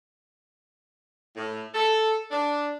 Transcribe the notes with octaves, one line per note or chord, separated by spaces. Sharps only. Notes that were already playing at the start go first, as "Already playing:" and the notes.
A2
A4
D4